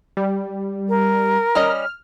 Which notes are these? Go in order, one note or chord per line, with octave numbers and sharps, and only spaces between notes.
G3
A#4
G3 C#4 D#5 F6